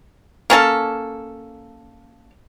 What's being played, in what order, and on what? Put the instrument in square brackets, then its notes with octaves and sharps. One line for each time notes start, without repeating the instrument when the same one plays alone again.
[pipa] A#3 C#4 A4